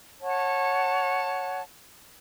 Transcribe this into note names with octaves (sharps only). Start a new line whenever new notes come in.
C#5 F#5 A5